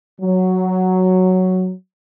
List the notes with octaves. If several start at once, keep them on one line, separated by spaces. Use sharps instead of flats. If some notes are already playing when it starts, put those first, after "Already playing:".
F#3